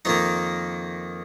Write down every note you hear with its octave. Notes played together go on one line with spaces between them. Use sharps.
F2 D#3 A#3 D#4